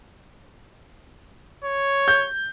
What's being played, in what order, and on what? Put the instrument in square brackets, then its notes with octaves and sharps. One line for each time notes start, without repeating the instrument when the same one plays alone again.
[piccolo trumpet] C#5
[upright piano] G6